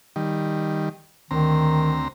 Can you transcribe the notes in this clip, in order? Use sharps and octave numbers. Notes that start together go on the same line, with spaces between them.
D#3 G3
D2 D#3 C4 A#5